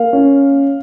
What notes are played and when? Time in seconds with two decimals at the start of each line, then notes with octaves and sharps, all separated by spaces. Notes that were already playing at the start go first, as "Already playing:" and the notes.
Already playing: A#3 F5
0.13 C#4